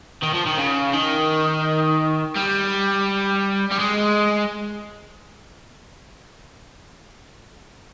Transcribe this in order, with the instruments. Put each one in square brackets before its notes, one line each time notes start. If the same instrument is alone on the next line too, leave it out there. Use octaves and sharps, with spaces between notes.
[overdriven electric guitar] D#3
F3
D#3
C#3
D#3
G3
G3
G#3